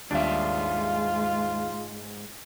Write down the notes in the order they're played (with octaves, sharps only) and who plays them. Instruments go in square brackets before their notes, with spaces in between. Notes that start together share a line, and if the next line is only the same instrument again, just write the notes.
[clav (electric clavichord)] D#2 G3 D4 [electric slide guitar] G#2 E5 [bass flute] G#3 [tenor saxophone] F4